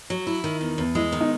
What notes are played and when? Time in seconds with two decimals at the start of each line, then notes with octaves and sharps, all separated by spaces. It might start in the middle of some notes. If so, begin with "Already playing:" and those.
0.10 F#3
0.27 E4
0.44 D#3
0.61 E2
0.78 E2
0.95 G#3 E4
1.12 D#3
1.21 D#4